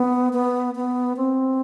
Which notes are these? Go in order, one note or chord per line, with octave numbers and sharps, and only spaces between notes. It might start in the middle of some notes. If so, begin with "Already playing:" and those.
Already playing: B3
B3
B3
C4